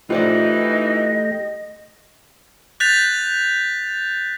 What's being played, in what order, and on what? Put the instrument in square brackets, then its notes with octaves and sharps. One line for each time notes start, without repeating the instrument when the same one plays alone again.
[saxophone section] E3 D#4 [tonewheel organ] A3 G4 [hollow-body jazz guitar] F4 C5 D5 [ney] D#5
[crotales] F#6 G6 A6 B6 F7